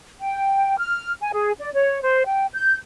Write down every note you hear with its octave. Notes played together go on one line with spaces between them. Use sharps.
G5
F6
G#5
G#4
D5
C#5
C5
G5
G6